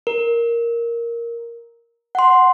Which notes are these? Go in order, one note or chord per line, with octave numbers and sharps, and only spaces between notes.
A#4
F#5 C6